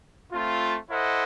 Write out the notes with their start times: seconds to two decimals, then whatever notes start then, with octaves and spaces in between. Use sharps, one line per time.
0.33 A3 C4 F4
0.90 E4 A4 C5 D#5 F#5